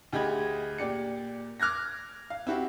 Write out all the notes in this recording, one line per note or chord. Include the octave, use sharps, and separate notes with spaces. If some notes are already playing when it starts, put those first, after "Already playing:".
D2 G4 G#4 D#5 B5 G#6
A#2 G4 D5 C#7
D6 F6 F#6 G#6 A#6
F5
C4 E4 F#4 G4